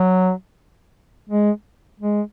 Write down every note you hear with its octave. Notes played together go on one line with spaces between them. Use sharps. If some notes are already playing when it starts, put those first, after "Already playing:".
Already playing: F#3
G#3
G#3